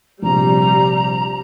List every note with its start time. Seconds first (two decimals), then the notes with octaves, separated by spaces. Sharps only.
0.22 A#1 C3 G3 A#5